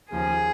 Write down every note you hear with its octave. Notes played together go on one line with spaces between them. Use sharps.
D#2 C#3 F3 G#4